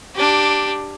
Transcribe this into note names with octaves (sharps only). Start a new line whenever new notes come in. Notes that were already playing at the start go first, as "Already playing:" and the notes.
D4 G4